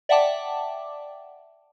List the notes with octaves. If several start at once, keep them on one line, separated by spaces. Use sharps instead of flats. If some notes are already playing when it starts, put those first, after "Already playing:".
D5 E5 F#5 G5 A5 D6